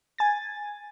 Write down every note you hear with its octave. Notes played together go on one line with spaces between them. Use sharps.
G#5 A6